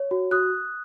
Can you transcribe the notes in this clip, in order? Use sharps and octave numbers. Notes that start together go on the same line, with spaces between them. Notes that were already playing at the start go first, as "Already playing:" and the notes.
Already playing: C#5
F#4
F#4 D#6 F#6